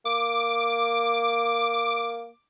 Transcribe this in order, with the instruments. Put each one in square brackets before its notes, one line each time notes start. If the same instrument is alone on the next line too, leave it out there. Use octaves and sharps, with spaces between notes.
[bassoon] A#3 [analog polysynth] D6